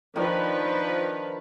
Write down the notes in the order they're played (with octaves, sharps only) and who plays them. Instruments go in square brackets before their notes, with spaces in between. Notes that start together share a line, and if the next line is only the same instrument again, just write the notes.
[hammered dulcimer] D#3 D4 [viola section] F3 B4